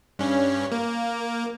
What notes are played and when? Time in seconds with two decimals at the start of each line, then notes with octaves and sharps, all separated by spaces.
0.19 G2 C#4
0.72 A#3